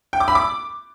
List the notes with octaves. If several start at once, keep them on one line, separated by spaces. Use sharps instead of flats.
G5
D6
B5
D6